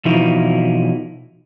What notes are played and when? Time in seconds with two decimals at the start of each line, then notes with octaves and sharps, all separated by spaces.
0.05 B2 E3 F3 D#4 E4 F#4